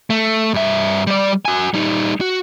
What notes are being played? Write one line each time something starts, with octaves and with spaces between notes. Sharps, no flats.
A3
G2 E5
G3 D5
F#4 G#5
G3 D#4
F#4